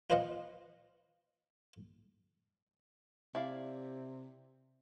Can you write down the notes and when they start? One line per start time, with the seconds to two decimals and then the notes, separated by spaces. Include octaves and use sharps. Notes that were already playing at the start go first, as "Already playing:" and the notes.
0.10 F4 B4 C5 D#5 F5 F#5
3.35 C3 E4 D5 F5